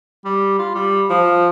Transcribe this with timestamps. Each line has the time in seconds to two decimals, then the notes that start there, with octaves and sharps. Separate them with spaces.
0.25 G3
0.59 F4
0.75 G3
1.10 F3